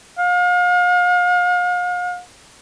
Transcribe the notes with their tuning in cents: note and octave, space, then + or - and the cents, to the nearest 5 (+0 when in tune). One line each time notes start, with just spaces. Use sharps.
F5 +40